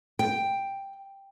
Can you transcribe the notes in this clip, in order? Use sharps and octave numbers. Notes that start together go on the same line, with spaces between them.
G5